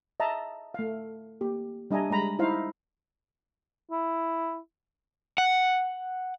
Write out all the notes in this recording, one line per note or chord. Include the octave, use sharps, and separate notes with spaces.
D#5 E5 A5 A#5
A3 F5
A#3 G4
G3 D4 D#5 E5 G#5 A#5
G3 G#3 A#5 B5
D#4 E4 C5 F5
E4
F#5